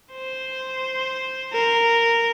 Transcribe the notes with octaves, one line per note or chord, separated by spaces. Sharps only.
C5
A#4